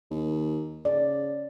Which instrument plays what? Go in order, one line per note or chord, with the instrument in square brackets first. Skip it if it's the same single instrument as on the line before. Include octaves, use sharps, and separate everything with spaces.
[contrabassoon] D#2
[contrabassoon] C#3 [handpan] D5